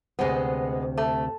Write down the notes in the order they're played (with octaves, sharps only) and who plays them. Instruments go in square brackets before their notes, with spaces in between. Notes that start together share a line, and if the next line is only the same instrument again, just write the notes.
[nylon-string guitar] D2 C3 C5 [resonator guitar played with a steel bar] G#3 B3
[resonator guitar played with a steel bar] A3